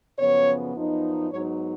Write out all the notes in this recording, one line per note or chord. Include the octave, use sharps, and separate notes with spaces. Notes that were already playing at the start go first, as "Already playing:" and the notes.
F#2 C#3 F3 B3 C#5
F#2 F3 B3 D#4
G#2 F#3 B3 D#4 C#5